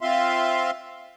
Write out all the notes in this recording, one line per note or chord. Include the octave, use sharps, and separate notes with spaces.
C4 F4 E5 F5 C6